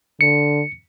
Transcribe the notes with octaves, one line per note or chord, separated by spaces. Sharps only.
D3 C#7